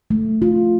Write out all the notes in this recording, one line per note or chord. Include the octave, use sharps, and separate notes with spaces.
A3
F4